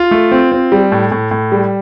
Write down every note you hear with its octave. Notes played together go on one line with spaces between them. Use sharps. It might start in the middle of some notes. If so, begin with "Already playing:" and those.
Already playing: F4
A3
C4
C4
G3
A2
A2
A2
G3